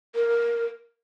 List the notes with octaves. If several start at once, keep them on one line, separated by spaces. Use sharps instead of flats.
A#4